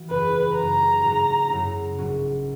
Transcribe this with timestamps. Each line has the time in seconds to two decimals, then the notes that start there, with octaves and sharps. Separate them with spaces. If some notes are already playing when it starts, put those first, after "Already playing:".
Already playing: E3 B3 F#4
0.10 F#1 E2 C#3 B4
0.57 F#2 C#3 F#3 A#3 A#5
1.04 G#2 F#3 A#3 C#4 F#4
1.50 F#2 C#3 F#3 B3 E4
1.98 A#1 G#2 F#3 C#4 F#4